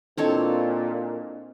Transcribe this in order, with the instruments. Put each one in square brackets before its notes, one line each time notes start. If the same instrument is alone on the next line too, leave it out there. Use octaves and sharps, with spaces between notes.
[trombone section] A#2 [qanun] C4 A4 C#5 [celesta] D4 E4 D#5